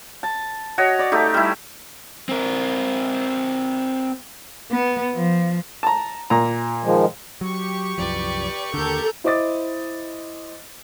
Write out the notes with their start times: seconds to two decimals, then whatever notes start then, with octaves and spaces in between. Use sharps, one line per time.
0.23 A5
0.78 F#4 C#5 D#5
0.99 D5
1.12 A3 D#4 G4
1.34 G3 E4
2.29 C4 A#4
4.71 B3
5.15 F3
5.83 A5 A#5
6.30 A#2 A#5
6.84 D#3 F3 G#3
7.41 F#3 G4 C#6
7.98 C2 F#2 F3 B4 D5
8.74 D#2 D3 A4 A#4 G6
9.24 E4 C5 D#5 D6 D#6 A6